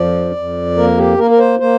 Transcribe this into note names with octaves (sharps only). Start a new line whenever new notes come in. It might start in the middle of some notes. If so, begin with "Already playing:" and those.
Already playing: F2 F3 D5
F2
A#3 A#4
G4
A#3 A#4
A#4
C5
A#3 C5